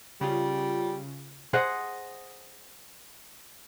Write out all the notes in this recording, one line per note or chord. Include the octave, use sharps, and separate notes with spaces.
C#3 G3 F4
G#4 C5 D#5 F#5